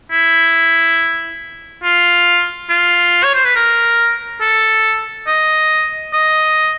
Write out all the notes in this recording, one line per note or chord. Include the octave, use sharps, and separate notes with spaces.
E4
F4
F4
C#5
C5
B4
A#4
A4
D#5
D#5